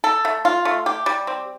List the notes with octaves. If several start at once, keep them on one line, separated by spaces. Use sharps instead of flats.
A4
A3
F4
A3
G4
G3
C4